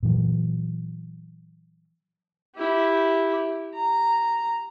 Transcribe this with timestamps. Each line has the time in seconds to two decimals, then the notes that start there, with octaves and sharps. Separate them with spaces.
0.03 A#2 E3 F#3
2.55 E4 G4
3.74 A#5